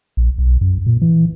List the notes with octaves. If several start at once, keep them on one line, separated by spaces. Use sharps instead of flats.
A#1
B1
F#2
A#2
E3